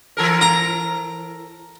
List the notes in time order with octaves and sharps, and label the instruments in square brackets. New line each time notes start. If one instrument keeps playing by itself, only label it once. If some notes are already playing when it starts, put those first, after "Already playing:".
[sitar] E3 A4 A#4
[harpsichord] A#5